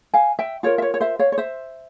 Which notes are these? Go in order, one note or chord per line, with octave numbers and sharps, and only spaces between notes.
F5 G#5
E5 G5
F4 A#4 C#5
E5
C#5
C#5
C5 E5
C#5 F5
C#5
C5 E5